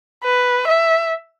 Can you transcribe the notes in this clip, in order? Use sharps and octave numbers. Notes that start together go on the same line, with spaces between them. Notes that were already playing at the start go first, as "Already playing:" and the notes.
B4
E5